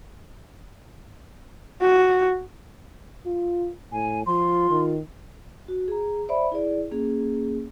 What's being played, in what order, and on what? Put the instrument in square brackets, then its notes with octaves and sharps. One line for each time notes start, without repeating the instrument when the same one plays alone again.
[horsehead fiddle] F#4
[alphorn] F4
[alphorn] A2 [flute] G#5
[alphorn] F3 [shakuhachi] F4 [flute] C6
[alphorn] D#3
[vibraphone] F#4
G#4 A#5
C5 D5 E5 B5
E4 G#4 D5
A#3 C#4 G#4